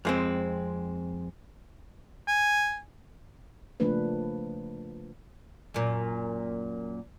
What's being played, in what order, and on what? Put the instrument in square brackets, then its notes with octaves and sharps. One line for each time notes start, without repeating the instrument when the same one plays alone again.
[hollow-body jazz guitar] F2 G#3 C4
[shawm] G#5
[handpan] C#3 F3 A3 A#3 D4 B4
[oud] F#2 A#2